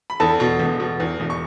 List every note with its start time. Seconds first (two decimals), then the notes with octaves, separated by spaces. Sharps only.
0.10 B5
0.20 E2 A4 A5
0.40 B2
0.59 E1
0.80 B2
1.00 E2
1.20 E1
1.30 C#6